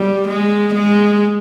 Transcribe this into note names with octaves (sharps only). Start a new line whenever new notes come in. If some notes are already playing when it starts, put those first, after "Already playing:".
Already playing: G3
G#3
G#3